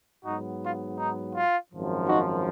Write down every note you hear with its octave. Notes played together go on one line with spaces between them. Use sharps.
G#2 F#3 B3 D#4 F#4
F4
D#4
F4
G#1 F#2 F3
D#4 F#4